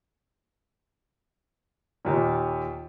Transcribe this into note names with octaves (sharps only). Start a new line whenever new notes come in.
D#2 A#2